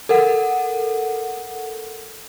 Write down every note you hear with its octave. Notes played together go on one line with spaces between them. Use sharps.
A4 A#4 F#5